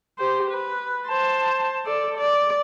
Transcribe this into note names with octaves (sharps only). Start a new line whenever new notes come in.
G4 C5
B4
C5 A5
A4 D5
D5